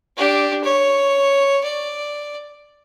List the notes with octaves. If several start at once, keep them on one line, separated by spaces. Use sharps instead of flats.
D4 G4
C#5
D5